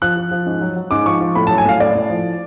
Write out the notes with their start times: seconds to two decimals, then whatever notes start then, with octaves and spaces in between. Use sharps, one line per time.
0.02 F3 F#6
0.17 F3
0.31 F3
0.46 G#2
0.61 F#3
0.76 F#3
0.91 G#2 D6
1.06 F3 C#6
1.20 F3
1.35 A2 B5
1.47 A5
1.50 F#3
1.58 G#5
1.65 A2 F5
1.80 A2 D5
1.95 A2
2.10 F3